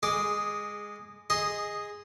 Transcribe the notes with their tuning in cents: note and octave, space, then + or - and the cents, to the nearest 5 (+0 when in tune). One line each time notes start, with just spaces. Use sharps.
G#3 -15 G#4 +0 D6 +10
G#4 -10 D#5 +0 C6 +0